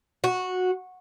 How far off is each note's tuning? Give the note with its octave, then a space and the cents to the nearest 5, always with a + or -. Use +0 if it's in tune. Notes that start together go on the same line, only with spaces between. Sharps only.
F#4 -10